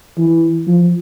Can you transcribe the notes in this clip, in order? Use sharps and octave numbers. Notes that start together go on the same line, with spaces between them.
E3
F3